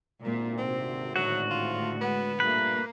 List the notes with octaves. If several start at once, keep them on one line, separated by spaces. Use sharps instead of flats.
G#1 D2 A#2
C3 C4
A2 D3 F#3 F#4
F4
G#3 B3 F#5
G2 A#2 A3 A#3 B4